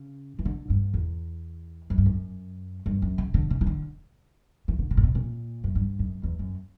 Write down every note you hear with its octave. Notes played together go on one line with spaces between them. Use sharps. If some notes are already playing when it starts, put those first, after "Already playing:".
Already playing: C#3
E3
D3
G2
E2
F#2
G2
F#2
G2
F#2
C#3
D3
C#3
E3
D3
E3
D3
C#3
A#2
B2
A#2
F#2
G2
F#2
E2
F#2